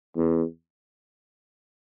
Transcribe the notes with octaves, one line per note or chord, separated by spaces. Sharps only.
E2